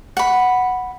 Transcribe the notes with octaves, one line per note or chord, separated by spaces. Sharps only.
F#5 B5